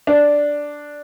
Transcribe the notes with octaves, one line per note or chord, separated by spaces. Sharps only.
D4